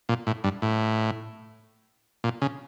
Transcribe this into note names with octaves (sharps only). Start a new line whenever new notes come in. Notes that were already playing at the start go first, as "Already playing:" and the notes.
A#2
A2
G2
A2
A#2
C#3